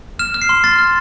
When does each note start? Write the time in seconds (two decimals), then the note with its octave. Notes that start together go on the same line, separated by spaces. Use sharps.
0.19 F6 E7
0.34 F6
0.42 C7
0.49 C6
0.64 C6 A6
0.79 F6